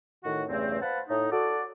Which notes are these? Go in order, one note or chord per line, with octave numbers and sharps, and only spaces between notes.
A2 D#3 F#4
E2 G2 C#3 A3 C4
B4 C5 F5 F#5 A5 B5
A2 D#4
F#4 A4 D5